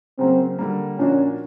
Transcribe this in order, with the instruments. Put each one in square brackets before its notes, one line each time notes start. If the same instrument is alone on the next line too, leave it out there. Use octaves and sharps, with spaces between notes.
[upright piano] C#3 F#3 A#3 [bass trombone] C4
[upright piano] D3 G3 A#3
[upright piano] A#2 F3 A#3 D4 F#4 [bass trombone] C#4